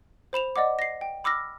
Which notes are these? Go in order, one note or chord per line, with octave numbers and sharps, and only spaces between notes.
C5 B5 E7 F7
D5 D#5 F#5 D6
A#6 C7
G5
B5 D6 E6 F6 A#6